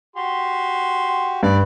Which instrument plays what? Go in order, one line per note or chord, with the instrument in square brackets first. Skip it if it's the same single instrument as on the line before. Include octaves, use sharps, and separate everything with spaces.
[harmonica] F#4 G4 C6
[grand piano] G2 [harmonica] B4 D5